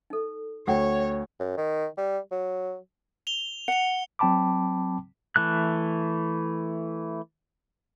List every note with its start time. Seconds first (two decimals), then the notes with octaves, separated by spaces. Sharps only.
0.10 D#4 A4
0.67 D2 F4 C#5 F#5 G5
1.40 F#2
1.57 D#3
1.98 G3
2.31 F#3
3.27 F7 G7
3.68 F#5 C#7 F7
4.19 F#3 C4 G5 A5 B5 D6
5.36 E3 A3 F#6